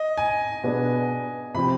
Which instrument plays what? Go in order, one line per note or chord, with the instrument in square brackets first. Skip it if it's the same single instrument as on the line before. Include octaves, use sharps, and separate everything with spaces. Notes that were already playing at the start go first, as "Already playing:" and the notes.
Already playing: [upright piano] D#5
G#5
[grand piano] B2 B3 D4 G#4
[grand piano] C3 F3 C4 G4 [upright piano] B5